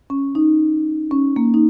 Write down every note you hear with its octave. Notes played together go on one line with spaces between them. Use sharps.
C#4
D#4
C#4
A#3
D#4